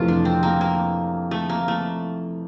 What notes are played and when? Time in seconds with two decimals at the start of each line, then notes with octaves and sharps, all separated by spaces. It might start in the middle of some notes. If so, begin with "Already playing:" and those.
Already playing: F2 C3 E3 A3 F4
0.08 D4
0.25 C4
0.43 A#3
0.61 A#3
1.31 A3
1.49 A#3
1.68 A3